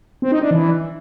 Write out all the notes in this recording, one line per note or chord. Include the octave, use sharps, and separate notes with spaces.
C4
D#4
D4
E3